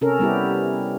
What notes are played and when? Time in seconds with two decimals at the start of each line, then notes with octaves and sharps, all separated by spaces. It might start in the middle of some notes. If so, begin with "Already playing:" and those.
0.01 C3 C#4 A4 A#4
0.19 G3 B3 E4 G4